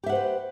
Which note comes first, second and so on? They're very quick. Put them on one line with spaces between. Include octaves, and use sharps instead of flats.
G4 E5 F#5 C5 B4